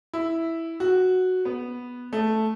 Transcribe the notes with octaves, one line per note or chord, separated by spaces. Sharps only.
E4
F#4
B3
A3